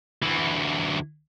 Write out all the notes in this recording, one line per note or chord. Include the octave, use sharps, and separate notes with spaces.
D2 E3